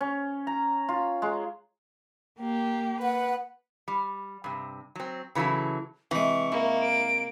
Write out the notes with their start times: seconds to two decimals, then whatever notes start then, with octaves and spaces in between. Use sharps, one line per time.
0.01 C#4
0.47 A#5
0.89 F4
1.22 G#3
2.40 A#3 G4
3.03 B4 F#5
3.88 G3
4.44 G2 C3
4.95 F#3 C4
5.35 C#3 E3 F#3 E4 A4
6.11 C3 E3 G#3 C#6
6.52 A#3 E4
6.81 D7